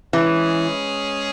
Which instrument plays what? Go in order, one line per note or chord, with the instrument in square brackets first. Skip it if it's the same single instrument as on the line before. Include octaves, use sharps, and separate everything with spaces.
[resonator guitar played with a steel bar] E3 [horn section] G#3 C#4 G#4